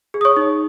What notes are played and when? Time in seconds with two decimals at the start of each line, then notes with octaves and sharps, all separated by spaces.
0.14 G#4
0.21 D#6
0.25 C#5 C#6
0.37 D#4